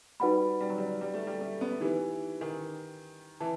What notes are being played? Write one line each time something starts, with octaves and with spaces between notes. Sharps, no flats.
G3 D#4 F#4 B4 F#5 B5
G3
F#3
G3
G3
A3
G3
A3
B3
E3 D#4 G4 B4
D#3
E3 E5 A5